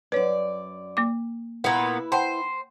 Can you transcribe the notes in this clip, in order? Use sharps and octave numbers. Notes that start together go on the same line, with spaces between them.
F#2 B4 C#5 D5
A#3 D6
A#2 B3 E4 B4
C5 F#5 G5 A5